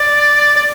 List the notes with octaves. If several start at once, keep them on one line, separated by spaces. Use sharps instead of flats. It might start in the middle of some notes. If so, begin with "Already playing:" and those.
Already playing: D5
D5